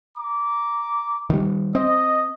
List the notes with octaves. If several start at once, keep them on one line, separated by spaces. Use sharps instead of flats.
A#5 D6
D#3 G3
C4 D#5